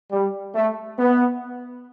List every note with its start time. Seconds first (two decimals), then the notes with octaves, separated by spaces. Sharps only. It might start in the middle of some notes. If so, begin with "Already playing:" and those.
0.11 G3
0.55 A3
0.99 B3